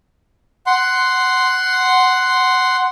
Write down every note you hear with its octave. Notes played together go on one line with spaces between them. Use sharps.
F#5 C6